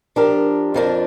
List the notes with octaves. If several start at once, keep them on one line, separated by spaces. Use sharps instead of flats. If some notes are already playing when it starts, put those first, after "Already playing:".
F3 D4 G4 A#4
F2 F3 D4 A#4